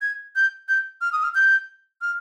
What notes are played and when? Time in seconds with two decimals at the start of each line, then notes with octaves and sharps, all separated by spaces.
0.02 G#6
0.36 G6
0.68 G6
1.01 F6
1.12 D#6
1.23 F6
1.35 G6
2.02 F6